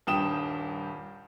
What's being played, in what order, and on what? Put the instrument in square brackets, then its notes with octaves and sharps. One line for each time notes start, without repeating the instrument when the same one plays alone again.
[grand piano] D#1 G2 G5 D#6 E7